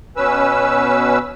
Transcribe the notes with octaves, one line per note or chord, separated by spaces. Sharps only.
B2 C#4 B4 E6